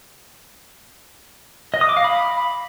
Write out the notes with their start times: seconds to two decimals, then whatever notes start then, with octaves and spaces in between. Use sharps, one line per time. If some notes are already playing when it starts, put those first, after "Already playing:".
1.74 D#5
1.81 D#6
1.89 D6
1.97 F5
2.04 B5